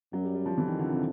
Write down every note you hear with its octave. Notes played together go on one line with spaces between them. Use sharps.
F#2 F#3
G3
G3
F3
F2 E3
D#3
D3
C3